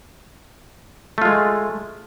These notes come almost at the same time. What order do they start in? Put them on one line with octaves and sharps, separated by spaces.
A3 F4 G#3